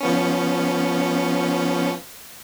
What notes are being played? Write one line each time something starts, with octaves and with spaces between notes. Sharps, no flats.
F3 B3 C#4